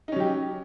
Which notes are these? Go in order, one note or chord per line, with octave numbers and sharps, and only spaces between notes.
F#3 C#4 D#4 G4